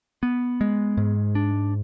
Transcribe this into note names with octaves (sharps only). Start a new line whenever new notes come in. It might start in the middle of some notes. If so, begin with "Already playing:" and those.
B3
G#3
G#2
D4